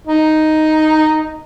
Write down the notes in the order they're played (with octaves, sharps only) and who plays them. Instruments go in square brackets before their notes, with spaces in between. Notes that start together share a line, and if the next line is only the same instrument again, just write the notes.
[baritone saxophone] D#4